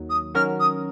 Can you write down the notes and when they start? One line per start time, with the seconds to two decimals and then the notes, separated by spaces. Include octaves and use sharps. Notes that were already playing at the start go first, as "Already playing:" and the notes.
Already playing: D#2 D#3 F#3
0.10 D#6
0.35 D#3 F#3 C#4 F#4 A#4 F6
0.60 D#6